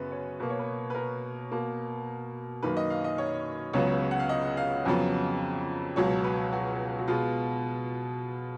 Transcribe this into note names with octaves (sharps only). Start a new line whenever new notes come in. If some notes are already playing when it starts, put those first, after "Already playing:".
Already playing: F#2 C#3 B3 B4
C#5
B2 A#3 B4
C#5
B4
B4
A#4
B2 A#3
F#2 D#3 A#3 B4
D#5
F5
D#5
C#5
C#2 C#3 F#3 B3 C#5
F#5
F5
D#5
F5
F2 C#3 F#3 B3
C#2 B2 F#3 C#5
B4
F#4
F#4
B2 G#3 B3 F4